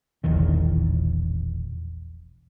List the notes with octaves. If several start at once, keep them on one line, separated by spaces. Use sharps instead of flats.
E1 A#1 E2 D#3